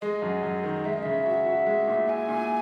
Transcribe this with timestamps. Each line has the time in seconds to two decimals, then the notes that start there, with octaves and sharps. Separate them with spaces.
0.01 G#3 D#5
0.22 F#2
0.43 F#2
0.63 D#3
0.84 G#3 E5
0.93 D#5
1.02 C#3 E5
1.26 F#4
1.46 F#4
1.67 G#3
1.88 A#2
2.08 E4 G#5
2.29 A#2